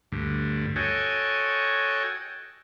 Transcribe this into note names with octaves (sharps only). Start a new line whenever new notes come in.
D2 G2
F#4 A4 C#5 D#5 G5 G#5